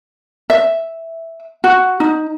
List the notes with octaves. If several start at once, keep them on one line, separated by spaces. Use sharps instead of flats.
E5
F#4
D#4